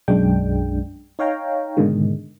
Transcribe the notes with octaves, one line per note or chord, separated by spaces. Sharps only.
B1 F#2 G#3 D4 G5
D#4 C#5 F5 G5 A#5
G#2 B2 D3 D#3 G#3